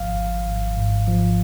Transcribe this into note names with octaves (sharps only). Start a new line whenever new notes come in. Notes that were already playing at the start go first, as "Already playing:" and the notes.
Already playing: G#1 F3 F5
G#1
G#1
G#2
F3